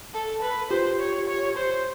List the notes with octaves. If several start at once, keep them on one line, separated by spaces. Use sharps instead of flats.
A4
B4
F4 G4 C5
C#5
C#5
C5